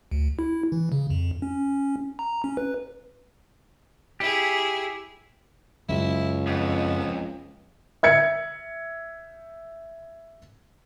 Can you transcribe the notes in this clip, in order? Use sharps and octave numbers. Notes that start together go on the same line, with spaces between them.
D2
E4
E3
C#3
F2
C#4
A#5
C#4
B4
E4 G4 G#4
F#1 C#2 F#3 E4
F2 B3
E5 G#6 C#7